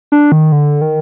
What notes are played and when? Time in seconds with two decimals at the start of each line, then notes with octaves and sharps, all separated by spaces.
0.12 D4
0.32 D#3
0.52 D3
0.81 D#3